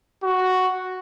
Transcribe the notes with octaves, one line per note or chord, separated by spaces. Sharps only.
F#4